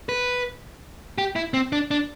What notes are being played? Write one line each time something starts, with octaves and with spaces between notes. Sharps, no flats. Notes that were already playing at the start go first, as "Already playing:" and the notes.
B4
G4
E4
C4
D4
D4